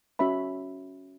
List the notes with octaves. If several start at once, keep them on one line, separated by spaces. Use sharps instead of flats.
C#4 F#4 C#5 E5 B5